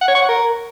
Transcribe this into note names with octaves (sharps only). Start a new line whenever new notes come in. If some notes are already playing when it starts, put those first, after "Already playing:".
F#5
C#5
C#6
F#5
A#4